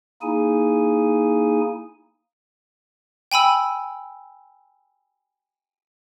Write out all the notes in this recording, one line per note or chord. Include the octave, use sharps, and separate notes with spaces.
A#3 D#4 E4 G#4 G#5
G5 G#5 B5 E6